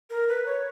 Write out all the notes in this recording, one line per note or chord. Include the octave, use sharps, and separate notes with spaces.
A#4
B4
C#5